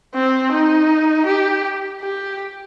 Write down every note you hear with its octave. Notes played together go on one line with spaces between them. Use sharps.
C4
D#4
G4
G4